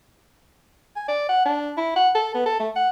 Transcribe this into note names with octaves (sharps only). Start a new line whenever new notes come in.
G#5
D5
F#5
D4
E4
F#5
A4
B3
A4
A3
F#5